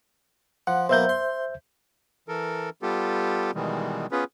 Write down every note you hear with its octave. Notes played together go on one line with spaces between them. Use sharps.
F3 F#5
B2 F#3 A#3 C5 E5 G6
C6
E3 A4 A#4
G3 B3 F4 G4 A4
B2 D#3 E3 G3 G#3
B3 C#4 F4 G#4 B4